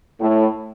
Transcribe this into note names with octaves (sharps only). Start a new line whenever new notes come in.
A2